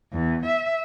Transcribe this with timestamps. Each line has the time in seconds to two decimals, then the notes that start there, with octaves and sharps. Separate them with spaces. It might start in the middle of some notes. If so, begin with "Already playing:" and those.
0.13 E2
0.45 E5